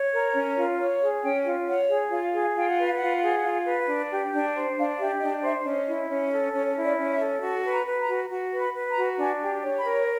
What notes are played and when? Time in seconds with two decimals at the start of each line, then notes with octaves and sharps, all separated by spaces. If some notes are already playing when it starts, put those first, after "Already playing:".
Already playing: C#5
0.12 A#4
0.34 C#4
0.55 F4
0.78 C#5
1.00 G#4
1.22 C#4 G5
1.44 F4
1.67 C#5 F#5
1.89 G#4
2.10 F4 F5
2.32 G#4
2.55 F4 G5
2.68 F#5
2.78 B4 F5
2.94 F4 F#5
3.22 G#4
3.44 F4
3.66 B4
3.87 D4
4.11 G4
4.32 D4
4.55 C5
4.77 D4 F5
4.99 G4 E5
5.20 D4 D#5
5.42 C5 E5
5.64 C#4 D#5
5.87 E4
6.09 C#4
6.31 A4
6.53 C#4 C#5
6.75 E4
6.83 D5
6.98 C#4
7.12 E5
7.19 A4
7.42 F#4
7.64 B4
7.71 A#5
7.86 B4
8.01 A#5
8.09 F#4
8.30 F#4
8.53 B4
8.60 B5
8.75 B4
8.90 A#5
8.97 F#4
9.18 D4 G#5
9.41 G4
9.63 C#5
9.78 B5
9.86 A#4